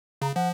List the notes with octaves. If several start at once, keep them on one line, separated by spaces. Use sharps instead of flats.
C#3 A#5
F3 F#5